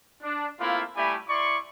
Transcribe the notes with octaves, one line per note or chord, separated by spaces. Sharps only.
D4
A3 A#3 C4 E4 F4
G3 A3 E4 G4 G#5 B5
E4 D5 C6 C#6